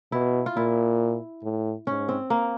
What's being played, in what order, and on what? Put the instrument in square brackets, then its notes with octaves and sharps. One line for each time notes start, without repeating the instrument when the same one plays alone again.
[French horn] B2 [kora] E4
[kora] F4
[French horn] A#2 [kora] E4
[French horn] A2
[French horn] G#2 [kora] C#4
[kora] C4
A#3